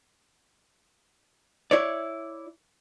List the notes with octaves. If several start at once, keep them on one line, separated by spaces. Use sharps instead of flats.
E4 C#5 D5